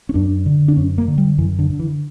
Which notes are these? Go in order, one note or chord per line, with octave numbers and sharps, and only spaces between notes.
C#4
F#2 D4
D3
D4
F#2 C#4
A#3
D3
G3
F#2 E3
D3
D3
E3